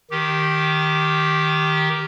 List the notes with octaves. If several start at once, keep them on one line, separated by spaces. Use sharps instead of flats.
D#3 G4